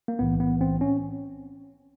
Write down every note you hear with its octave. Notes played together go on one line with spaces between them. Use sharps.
A#3
B1 A2 E3 B3
B3
C4
C#4